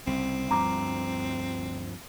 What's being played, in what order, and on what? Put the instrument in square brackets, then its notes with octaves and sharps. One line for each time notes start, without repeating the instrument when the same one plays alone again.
[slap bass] C2 C#3 [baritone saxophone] C4
[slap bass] D2 G2 F3 [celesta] A#5 D6